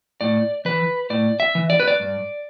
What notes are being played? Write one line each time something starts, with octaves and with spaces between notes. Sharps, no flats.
A2 D5
E3 B4
A2 D5
E5
E3
D5
B4
D5
G2